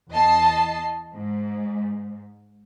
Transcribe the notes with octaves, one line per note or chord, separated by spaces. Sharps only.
E2 D#5 A5 C7
G#2